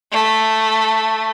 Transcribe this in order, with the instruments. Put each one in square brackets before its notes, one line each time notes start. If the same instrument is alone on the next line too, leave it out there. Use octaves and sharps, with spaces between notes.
[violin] A3